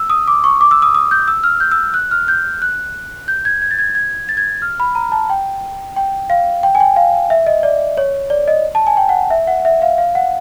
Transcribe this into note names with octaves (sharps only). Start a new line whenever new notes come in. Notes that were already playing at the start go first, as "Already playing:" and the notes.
Already playing: E6
D#6
D6
C#6
D6
E6
D#6
D#6
G6
E6
F6
G6
E6
F#6
F6
G6
F#6
G6
G#6
G#6
A6
G#6
G#6
A6
G#6
F6
B5
A#5
A5
G5
G5
F5
G5
G#5
G5
F5
E5
D#5
D5
C#5
D5
D#5
A5
G#5
G5
F#5
E5
F#5
E5
F5
F5
F#5